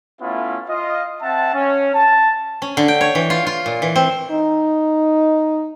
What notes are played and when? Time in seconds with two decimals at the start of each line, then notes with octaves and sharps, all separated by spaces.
0.21 A3 B3 C#4 E4 F4
0.69 F4 D#5
1.22 C4 E5 F#5 A5
1.54 C#4
1.95 A5
2.62 C#4
2.77 D3
2.88 G5
3.01 C#5
3.15 E3
3.30 F4
3.47 F4
3.66 A#2
3.82 E3
3.96 C4
4.31 D#4